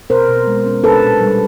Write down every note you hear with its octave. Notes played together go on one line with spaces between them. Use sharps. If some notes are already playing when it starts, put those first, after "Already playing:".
B2 A#4 C5
B2
G#3
C#4
D4 A4 B4
A#2
G3